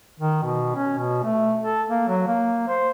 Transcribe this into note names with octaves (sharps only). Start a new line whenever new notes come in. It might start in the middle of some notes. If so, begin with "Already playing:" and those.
D#3
B2
C#4
B2
A3
A4
A#3
F#3
A#3
C5